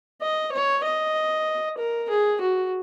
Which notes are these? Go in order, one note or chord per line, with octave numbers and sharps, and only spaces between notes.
D#5
C#5
D#5
A#4
G#4
F#4